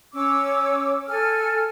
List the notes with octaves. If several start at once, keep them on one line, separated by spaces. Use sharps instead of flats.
C#4 C#5 D6 E6
A4 G#5 F6